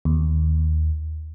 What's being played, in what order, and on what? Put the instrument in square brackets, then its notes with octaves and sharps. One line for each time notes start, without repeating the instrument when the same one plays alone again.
[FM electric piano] D#2